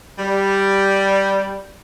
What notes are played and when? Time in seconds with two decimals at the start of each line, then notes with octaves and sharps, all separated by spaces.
0.17 G3